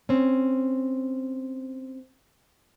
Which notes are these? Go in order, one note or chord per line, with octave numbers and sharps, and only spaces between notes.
C4 C#4